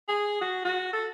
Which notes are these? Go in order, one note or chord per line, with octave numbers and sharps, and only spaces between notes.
G#4
F#4
F#4
A4